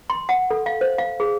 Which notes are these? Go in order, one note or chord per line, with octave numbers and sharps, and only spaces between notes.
C6
F#5
A4
F5
C5
F5
G#4